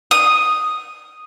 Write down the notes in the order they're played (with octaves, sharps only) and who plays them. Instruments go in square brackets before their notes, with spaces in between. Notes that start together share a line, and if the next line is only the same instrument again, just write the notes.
[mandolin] D#6